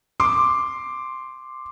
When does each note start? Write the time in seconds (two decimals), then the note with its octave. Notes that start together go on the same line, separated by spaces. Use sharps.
0.20 C6 D6